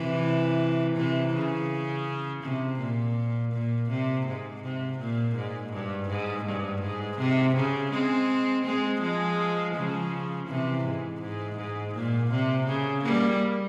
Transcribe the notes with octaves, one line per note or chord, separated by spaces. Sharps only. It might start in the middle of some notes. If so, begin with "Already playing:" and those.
Already playing: C3 E3
C3 E3
C#3
C3
A#2
A#2
C3
G#2
C3
A#2
G#2
G2
G#2
G2
G#2
C3
C#3
G#3 C4
G#3 C4
F3 G#3
C#3 F3
C3 E3
G#2
G#2
G#2
A#2
C3
C#3
G3 A#3